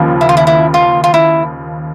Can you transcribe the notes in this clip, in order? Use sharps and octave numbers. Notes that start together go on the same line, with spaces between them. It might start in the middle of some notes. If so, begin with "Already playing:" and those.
Already playing: D#2 C#3 F3
E4
F4
E4
E4
F4
F4
E4